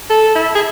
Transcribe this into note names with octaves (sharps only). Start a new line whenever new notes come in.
A4
E4
G#4